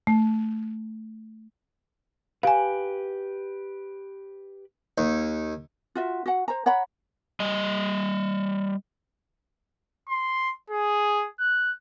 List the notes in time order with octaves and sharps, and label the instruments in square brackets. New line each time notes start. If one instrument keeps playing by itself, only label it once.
[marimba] A3
[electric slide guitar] G4 B4 [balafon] F5 G#5
[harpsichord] D#2
[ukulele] F4 F#4 E5
F#4 F#5
C5 A#5
C#5 F#5 A#5 B5
[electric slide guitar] G3 D#5
[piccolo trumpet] C6
G#4
F#6